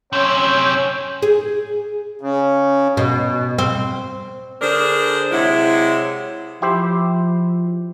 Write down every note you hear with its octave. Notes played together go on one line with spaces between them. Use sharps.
F#2 C3 C#4 C#5 G5 E6
G#4
C#3
B2
C4
D3 D4 G#4 A#4 C5
C3 F#3 G#3 E4
F3 E4 G4 C5